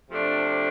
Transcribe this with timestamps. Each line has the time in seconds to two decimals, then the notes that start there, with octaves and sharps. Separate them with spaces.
0.10 C3 F3 A3 D4